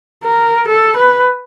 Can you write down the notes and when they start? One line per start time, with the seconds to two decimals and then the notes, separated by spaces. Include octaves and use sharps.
0.24 A#4
0.68 A4
0.96 B4